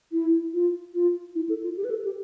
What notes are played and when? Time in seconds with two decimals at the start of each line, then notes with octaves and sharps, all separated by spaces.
0.12 E4
0.53 F4
0.94 F4
1.35 E4
1.49 A4
1.63 F4
1.77 G4
1.84 B4
1.90 A4
2.05 G4